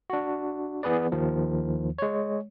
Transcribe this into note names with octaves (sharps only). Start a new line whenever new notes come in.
D4 F#4
E3 B3 G#4 B4 D5
D#2 D#3 F3
G#3 C#5